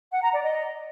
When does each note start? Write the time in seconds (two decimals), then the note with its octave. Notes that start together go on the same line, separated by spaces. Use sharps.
0.12 F#5
0.22 A#5
0.32 D5
0.43 D#5